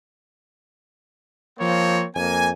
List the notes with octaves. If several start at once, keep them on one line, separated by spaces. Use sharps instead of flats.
F3 A#3 C4 C#5
F2 A#3 G#5